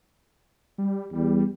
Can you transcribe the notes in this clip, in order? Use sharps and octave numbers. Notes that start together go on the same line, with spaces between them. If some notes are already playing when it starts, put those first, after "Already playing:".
G3
E2 G3